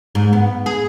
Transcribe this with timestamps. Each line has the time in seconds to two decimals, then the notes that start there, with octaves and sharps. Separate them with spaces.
0.15 G#2
0.33 B3
0.66 G#4